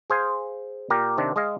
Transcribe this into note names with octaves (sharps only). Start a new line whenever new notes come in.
G#4 C5 F5 G#5
A#2 G4 A#4
C3 D#3 C4 D4
G#3 G#4 D#5 F5